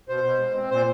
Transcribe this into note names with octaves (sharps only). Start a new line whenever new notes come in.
B2 C5
B2
G#3
C4
A#2 C5